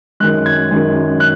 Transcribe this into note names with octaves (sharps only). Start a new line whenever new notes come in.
F#2 D#3 G#3 F#6
G#6
F#2 D#3 G#3
F#6